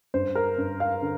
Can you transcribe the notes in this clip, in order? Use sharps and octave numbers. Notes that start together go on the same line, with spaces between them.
G2 C5
A#4
G2
F5
D3